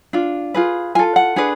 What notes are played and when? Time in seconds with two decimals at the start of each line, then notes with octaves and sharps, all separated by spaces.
0.13 D4 F4
0.54 F4 G#4 B4
0.95 F4 A4 G#5
1.16 F#5
1.36 D4 G#4 B4